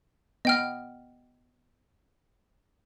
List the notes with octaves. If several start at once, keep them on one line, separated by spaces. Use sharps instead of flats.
B3 D#5 G5 F6